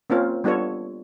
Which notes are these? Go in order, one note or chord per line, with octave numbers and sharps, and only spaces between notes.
A#3 C4 C#4 F4
G3 B3 D4 F4 A4 C#5